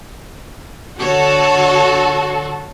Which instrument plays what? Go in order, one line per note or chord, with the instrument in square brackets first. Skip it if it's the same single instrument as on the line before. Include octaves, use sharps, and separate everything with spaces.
[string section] D3 F#4 A4 [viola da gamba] C#5